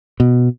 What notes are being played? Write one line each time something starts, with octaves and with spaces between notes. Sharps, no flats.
B2